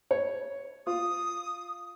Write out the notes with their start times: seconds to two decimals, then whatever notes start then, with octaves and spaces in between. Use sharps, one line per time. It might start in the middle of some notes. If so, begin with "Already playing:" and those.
0.11 C#5
0.87 F4 D#6